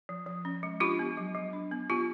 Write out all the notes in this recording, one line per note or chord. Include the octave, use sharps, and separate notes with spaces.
F3
F3
C#4
G#3
D4 F4 G4
B3
F#3
F#3
D4
B3
B3 F4 G4